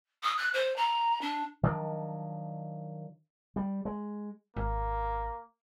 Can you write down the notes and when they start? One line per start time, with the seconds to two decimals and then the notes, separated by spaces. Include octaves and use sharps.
0.23 D#6
0.37 F#6
0.53 C5
0.76 A#5
1.21 D4
1.63 D#3 F3 F#3 D4
3.56 G3
3.85 G#3
4.57 G#1 A#3